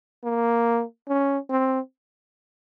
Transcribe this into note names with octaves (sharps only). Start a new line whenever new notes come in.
A#3
C#4
C4